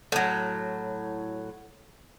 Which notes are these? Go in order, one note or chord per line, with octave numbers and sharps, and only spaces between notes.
A2 F#3